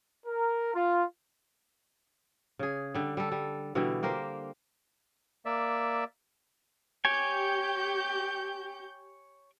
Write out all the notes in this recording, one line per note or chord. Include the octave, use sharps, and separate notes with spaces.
A#4
F4
C#3 G#4
D3 G3
G3 A4
G3
B2 D3 E3 G3
A#3 G4 A#4 C5
A#3 D5 E5
G4 C#5 G5 G#5 G6